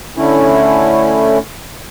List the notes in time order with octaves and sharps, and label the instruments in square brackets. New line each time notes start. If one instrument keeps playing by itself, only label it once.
[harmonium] D3 A3 C#4 E4